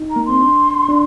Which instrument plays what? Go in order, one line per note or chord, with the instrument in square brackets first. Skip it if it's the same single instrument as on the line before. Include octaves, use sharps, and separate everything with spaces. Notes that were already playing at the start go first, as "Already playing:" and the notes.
Already playing: [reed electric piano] D#4
[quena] A#5
[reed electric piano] A#3
[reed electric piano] C4 [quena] C6
[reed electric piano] D4
D4